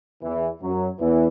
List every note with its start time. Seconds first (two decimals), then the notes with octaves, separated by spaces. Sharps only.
0.23 E2 E3
0.62 F#2 F#3
1.00 E2 E3